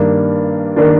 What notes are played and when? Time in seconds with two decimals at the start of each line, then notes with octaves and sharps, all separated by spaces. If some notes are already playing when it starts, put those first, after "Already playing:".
Already playing: G2 D#3 A#3 D4
0.76 D#3 A#3 D4